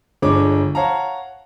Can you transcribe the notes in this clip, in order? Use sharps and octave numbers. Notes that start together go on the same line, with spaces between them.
G1 G#3 D4 C#5 D6
C#5 F5 F#5 A5 A#5